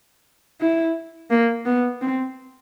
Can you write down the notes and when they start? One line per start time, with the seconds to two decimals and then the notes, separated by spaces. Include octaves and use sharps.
0.61 E4
1.31 A#3
1.66 B3
2.02 C4